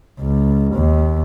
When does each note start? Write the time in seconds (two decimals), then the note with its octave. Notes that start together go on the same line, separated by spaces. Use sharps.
0.20 C#2
0.75 D#2